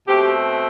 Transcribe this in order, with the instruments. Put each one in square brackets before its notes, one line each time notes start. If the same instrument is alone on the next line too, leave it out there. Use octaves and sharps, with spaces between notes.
[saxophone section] B2 A3 C4 G4